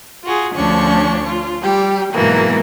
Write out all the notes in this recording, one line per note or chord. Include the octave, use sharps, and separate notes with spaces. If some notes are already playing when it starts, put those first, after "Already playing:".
F4 F#4 G#4
D2 F3 C#4 D4 C#6
F4
G3 G4
G#2 B2 E3 F#3 A#3